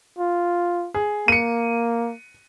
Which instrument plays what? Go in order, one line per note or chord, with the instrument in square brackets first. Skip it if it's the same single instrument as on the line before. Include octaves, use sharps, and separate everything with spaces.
[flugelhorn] F4
[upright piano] G#4
[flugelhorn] A#3 [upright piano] C#7 D#7